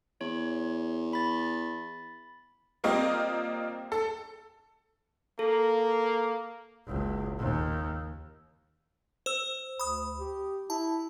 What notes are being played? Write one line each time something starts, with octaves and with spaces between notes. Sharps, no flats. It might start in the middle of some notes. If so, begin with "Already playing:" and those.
E2 C#5
B5 A6
G3 A#3 C4 F4 D#5
A4
A#3 A4
F#1 C#2
D#2
C5 E6
D2 B5 D#6
G4
E4 A5